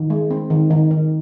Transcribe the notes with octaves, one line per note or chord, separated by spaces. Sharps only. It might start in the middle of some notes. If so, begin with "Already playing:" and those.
Already playing: D#3
G#3
C4
D#3
D#3
D#3